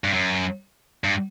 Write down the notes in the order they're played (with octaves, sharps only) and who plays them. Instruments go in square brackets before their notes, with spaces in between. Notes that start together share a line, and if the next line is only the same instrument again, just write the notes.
[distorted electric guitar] G2
F#2
G2